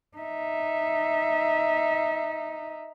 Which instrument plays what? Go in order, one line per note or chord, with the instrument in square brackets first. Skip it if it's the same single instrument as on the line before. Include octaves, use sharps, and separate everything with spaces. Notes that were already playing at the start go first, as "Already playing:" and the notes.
[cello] D#4 E5